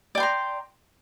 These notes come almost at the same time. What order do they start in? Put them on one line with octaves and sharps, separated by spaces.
D5 G5 C6 A#5